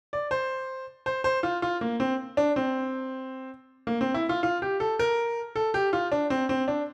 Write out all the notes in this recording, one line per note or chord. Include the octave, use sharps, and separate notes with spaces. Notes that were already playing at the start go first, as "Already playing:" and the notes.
D5
C5
C5
C5
F4
F4
A#3
C4
D4
C4
A#3
C4
E4
F4
F4
G4
A4
A#4
A4
G4
F4
D4
C4
C4
D4